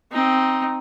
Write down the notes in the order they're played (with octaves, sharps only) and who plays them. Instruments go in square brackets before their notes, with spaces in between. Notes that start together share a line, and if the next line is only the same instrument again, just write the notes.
[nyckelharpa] C4 D#4